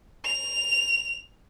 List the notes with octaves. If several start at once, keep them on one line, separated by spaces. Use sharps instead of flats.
F7